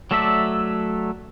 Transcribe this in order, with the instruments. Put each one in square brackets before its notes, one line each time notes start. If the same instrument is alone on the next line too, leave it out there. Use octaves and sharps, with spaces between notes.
[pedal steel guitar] F#3 A3 A4 D5 E5